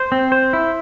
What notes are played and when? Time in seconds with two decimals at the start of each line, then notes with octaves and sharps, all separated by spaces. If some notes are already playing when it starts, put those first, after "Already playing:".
Already playing: C5
0.12 C4
0.32 C5
0.53 E4